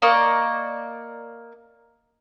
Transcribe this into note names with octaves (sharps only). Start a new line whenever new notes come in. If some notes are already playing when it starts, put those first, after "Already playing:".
A#3 D5 D#5 C#6